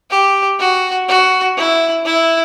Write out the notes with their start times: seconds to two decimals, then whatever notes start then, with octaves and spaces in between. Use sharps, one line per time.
0.10 G4
0.59 F#4
1.08 F#4
1.57 E4
2.05 E4